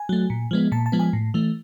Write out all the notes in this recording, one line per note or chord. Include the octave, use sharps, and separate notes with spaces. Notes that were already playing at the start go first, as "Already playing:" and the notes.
Already playing: G#5
F#3 A3
A#2
F3 G#3 B3
A#2 A5
A5
F3 G#3 B3
G#5
A2
E3 A3